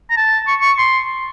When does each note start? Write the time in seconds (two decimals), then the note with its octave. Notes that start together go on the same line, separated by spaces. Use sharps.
0.10 A#5
0.17 A5
0.47 C#6
0.61 C#6
0.78 C6